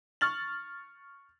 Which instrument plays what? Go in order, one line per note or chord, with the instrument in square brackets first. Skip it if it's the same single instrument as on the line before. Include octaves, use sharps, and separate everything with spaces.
[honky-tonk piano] C#6 F6 A6 F#7